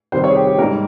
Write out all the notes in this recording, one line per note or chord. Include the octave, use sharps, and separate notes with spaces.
C3 D#3 G3 C5
C#5
G#4
G4
G4
G#2 G3 A#3 A#4